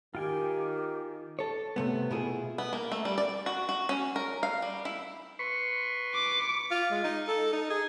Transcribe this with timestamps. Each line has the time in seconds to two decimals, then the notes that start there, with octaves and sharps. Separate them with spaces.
0.15 D#3 F4 G4 G5 G#5
1.39 A4 C#5
1.76 C3 A3 B3
2.11 B2 A3 E4 F4 G#4
2.58 B3
2.73 A#3
2.92 A3
3.05 G3
3.18 D5
3.46 F#4
3.69 F#4
3.89 C#4
4.16 A#4
4.43 F5
4.62 G3
4.85 E4
5.39 B4 C6 C#6
6.14 D6
6.71 F4
6.91 G#3
7.04 D#4
7.28 A4
7.53 D#4
7.70 G#4